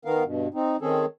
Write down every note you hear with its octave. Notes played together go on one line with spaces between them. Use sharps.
D#3 B3 A#4 F5
G2 B2
C4 D#4
D#3 C4 C#4 G#4 A4